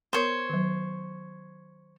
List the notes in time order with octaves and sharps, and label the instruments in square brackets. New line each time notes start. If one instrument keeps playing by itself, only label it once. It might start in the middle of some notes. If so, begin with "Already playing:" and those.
[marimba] B3 A#4 D#6 [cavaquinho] C5 C#5
[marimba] D#3 F#3